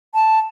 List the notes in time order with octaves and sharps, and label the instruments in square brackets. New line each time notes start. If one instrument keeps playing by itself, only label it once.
[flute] A5